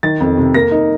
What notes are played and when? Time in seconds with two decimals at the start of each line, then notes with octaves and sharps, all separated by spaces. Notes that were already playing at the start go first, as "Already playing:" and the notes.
0.03 D#3 A6
0.20 F2
0.38 C3
0.54 A#3 A#6
0.72 D#4